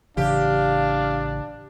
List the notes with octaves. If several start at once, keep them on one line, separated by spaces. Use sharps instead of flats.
A1 C#3 E3 D4 G4 F5